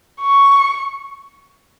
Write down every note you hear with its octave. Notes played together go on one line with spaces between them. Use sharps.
C#6